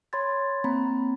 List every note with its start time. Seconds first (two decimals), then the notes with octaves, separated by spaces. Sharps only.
0.13 C#5 B5 C6 G#6 A6
0.64 A#3 C4 A#5 B5